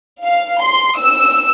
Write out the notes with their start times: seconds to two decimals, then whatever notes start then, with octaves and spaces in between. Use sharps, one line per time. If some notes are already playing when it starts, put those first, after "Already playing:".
0.24 F5
0.62 C6
0.98 E6